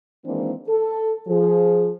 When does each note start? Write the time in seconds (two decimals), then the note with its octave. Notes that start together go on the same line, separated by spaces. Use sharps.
0.25 D#3 E3 G#3 A#3 C4 D4
0.68 A4
1.28 F3 G#4